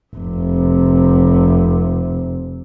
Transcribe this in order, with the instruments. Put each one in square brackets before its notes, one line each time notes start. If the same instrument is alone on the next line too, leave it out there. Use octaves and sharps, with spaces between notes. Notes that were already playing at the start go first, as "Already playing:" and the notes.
[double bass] F1 C3